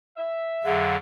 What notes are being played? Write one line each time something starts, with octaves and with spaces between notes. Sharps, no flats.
E5
F2 D3 F#3 G#4 F5 F#5